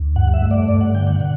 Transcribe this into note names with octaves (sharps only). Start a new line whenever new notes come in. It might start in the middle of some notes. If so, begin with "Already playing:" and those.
Already playing: D2
G2 F#5
E5
A3
D5
G2 D5
F#5
D3 G5
F#5
B2 F#5